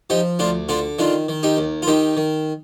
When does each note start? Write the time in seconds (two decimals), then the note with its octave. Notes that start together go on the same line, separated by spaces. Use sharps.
0.10 F3 D#4 G4
0.39 D2 D4 F4
0.69 D3 D4 F4
0.99 D#3 D4 F4
1.29 D#3
1.43 D#4 G4
1.57 D#2
1.82 F4
1.87 D#3 D#4 G4
2.17 D#3